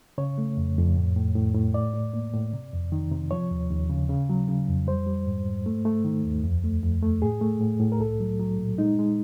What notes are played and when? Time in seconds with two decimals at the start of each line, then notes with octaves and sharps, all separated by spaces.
0.18 C#3 C#5
0.38 A3
0.57 F2
0.77 F2
0.96 A2
1.16 A2
1.36 A2
1.55 A2
1.74 A2 D5
1.94 A2
2.14 A#3
2.34 A2
2.53 C3
2.73 F2
2.92 D#3
3.12 C3
3.31 F3 C#5
3.51 D#2
3.71 D#2
3.90 C#3
4.09 C#3
4.29 F#3
4.48 C#3
4.68 F2
4.87 G3 C5
5.07 G3
5.26 G#2
5.46 G#2
5.66 A3
5.85 A3
6.04 D#3
6.25 D#2
6.44 F2
6.64 A3
6.83 F2
7.02 A3
7.22 A2 G#4
7.41 A3
7.61 A2
7.80 A2
7.92 A#4
8.00 C2 A4
8.20 F#3
8.39 F#3
8.59 A#2
8.78 G#3 D#4
8.99 G#3